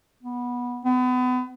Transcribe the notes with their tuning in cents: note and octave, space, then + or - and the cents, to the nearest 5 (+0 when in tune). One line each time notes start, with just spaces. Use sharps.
B3 -15
B3 +35